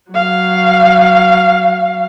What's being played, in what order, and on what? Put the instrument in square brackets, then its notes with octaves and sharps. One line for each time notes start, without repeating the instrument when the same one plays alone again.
[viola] F#3 F5